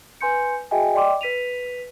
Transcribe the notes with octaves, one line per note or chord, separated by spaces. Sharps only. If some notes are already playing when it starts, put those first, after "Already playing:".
B4 G#5 C6 G6 C#7
F#4 G#4 D#5 E5 G5 G#5
D5 D#5 G5 C6 D6
B4 B6 D#7 F7